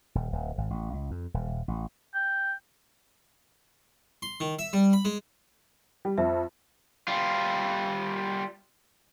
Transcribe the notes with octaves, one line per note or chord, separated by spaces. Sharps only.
D#1
D1
G#1
A1
C#2
F2
D#1
A1
G5
C6
D#3
E5
G3
B5
G#3
G3
F2 E5
G3 F4